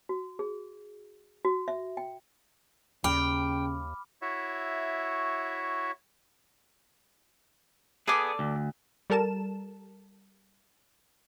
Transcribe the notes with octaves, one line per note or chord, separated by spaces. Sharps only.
F#4
G#4
F#4
E5
G5
D#2 C#3 G5 B5 D6 F6
E4 F#4 C#5 E5
B3 G#4 A4 D5 D6
D2
G3 A4 A#4 A5 E7